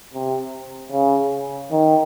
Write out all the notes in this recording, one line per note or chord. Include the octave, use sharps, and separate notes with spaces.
C3
C#3
D#3